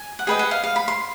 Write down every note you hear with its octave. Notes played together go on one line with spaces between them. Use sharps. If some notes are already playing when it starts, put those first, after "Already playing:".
Already playing: G#5
F#5
G#4 B4 D#5 G5
F#5
F5
F5
B5
C6